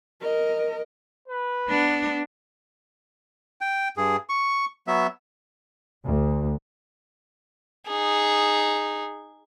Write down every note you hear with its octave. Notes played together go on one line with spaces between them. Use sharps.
A#4 D#5
B4
B3 D4
G5
G2 G#4
C#6
F#3 B3 E5
D2
D#4 G#4